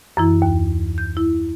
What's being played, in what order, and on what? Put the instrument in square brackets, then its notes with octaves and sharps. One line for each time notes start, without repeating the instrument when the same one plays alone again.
[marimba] F#2 E3 E4
D#2
G6
E4